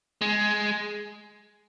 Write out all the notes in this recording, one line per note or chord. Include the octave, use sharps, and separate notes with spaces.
G#3